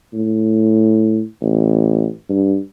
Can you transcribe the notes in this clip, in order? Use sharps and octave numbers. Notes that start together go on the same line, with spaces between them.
A2
A1
G2